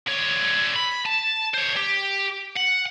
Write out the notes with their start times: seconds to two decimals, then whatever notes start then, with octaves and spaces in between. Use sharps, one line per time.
0.08 D3 C#5
0.76 B5
1.06 A5
1.54 C5 C#5
1.76 G4
2.57 F#5